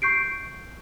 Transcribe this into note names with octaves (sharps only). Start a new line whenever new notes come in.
C#6 G6 C7 D7